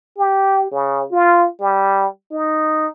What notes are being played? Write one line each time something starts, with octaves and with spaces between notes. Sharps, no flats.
G4
C#3
F4
G3
D#4